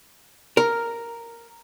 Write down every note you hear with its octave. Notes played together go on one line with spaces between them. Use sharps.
A#4